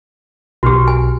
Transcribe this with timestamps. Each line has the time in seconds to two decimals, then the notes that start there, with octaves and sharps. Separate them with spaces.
0.63 B1 B2 F#4 G4 F6
0.88 G#5